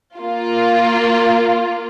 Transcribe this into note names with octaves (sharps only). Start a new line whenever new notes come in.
A#3 F4